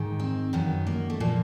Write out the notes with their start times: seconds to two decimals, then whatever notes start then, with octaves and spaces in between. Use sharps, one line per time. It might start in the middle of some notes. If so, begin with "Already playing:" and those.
Already playing: G#2 D#3
0.20 C4
0.53 F#2 D#3 B3
0.87 A#3
1.10 A3
1.20 A#2 F3 A#3